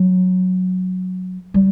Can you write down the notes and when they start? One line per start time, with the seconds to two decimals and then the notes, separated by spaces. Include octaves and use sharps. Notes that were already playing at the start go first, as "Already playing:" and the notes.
Already playing: F#3
1.54 G3